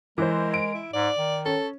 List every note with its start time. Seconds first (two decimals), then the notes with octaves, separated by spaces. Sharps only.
0.18 E3 G#3 A#4 C5
0.54 D7
0.74 E4
0.93 G#2 D5
1.18 D#3
1.45 C#4 A4